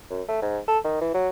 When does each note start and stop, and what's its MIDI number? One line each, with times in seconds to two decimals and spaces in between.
0.10 0.22 42
0.29 0.38 57
0.42 0.59 44
0.68 0.78 69
0.85 1.01 51
1.01 1.10 52
1.14 1.29 54